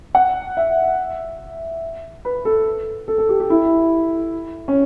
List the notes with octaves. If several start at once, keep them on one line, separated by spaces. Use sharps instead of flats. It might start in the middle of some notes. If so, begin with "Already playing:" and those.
F#5
E5
B4
A4
A4
A4
G4
G4
E4
C#4